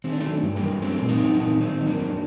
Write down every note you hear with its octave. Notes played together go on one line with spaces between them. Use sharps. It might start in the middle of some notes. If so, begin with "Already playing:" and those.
D#3 C4
D4
F#3 A3 C4
G2
G3 A#3
G2
F#3 A3 C4
A#2
C4 D#4
F#3
C4 D#4
A#2
D#3 C4 D#4
F#3
A#3 D4
F#2